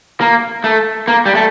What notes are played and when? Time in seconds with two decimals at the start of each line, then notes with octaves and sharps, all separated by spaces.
0.21 A#3
0.64 A3
1.08 A#3
1.26 G3
1.35 A3